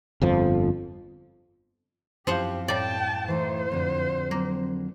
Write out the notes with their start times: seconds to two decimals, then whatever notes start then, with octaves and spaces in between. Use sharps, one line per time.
0.22 G1 F2 F3
2.27 F#2 F3 C4 E4 G4 C5 F5 F#5
2.68 A2 G3 D5 G5 A5
3.28 E3 A3 D#4 C5
3.72 F2 D3
4.31 F#3 A#3 C4